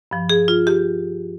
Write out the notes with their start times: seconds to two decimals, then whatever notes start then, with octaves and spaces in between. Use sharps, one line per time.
0.11 G2 F3
0.30 G#4
0.48 F4
0.67 G4